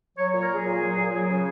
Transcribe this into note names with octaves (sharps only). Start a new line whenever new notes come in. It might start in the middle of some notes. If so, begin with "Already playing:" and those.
F#3 C#5
A#2 C#5
A#4
F#3 G#4
A#2
F#3
A#2
F#3
C#3